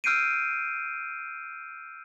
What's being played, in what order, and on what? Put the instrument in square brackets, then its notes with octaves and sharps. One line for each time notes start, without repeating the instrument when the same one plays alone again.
[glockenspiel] E6 F6 G6 C7 D7 D#7